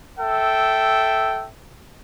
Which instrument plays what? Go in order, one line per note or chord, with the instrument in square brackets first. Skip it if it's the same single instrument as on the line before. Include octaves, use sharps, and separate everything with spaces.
[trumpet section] A4 E5 G5